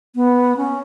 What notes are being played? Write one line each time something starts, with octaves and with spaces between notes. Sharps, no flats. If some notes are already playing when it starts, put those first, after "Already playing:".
B3
C#4